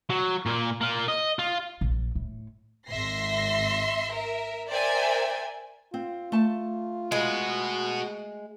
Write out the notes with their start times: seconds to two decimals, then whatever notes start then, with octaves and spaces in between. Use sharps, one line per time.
0.10 F#3
0.46 A#2 A#3
0.81 A#3 F4
1.08 D#5
1.39 F4
1.81 A#1
2.15 A2
2.88 G#1 E5 C6 A#6 C7
4.12 A#4 E5
4.69 A#4 C5 D5 E5 G5 G#5
5.94 C4 F4
6.32 A3 A5
7.12 G#3 F#4 B4